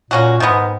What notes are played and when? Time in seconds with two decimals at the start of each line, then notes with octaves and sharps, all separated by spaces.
0.10 A#2 A#3 C#4 F#4
0.40 G#2 D#3 G#3 B3